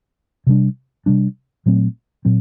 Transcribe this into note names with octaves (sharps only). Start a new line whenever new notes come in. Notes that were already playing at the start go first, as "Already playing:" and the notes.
C3 G3 D4
C3 G3 D4
A#2 F#3 A3 C4
A#2 F#3 C4